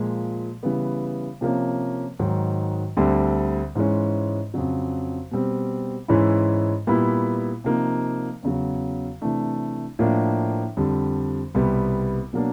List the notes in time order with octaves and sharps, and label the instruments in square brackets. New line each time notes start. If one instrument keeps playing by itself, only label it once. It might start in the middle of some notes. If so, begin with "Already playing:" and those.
Already playing: [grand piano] A#2 F3 G#3
C#3 E3 G3 B3
C3 F3 A#3 C#4
G#2 D#3 F#3
D2 D3 G3 C4
G#2 E3 G#3 C#4
F2 C#3 F#3
B2 G3 C4
G#2 E3 G#3 C#4 E4
A#2 G3 B3 E4
C3 F3 A#3 D#4
E2 C#3 F#3
C3 E3 A3 D4
A2 F3 A#3 D4
F2 D3 G3
C2 B2 G3 B3
B2 F#3 A#3 D4